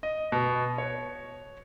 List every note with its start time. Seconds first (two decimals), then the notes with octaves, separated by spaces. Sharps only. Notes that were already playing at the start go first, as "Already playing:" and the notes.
0.03 D#5
0.32 B2
0.78 C#5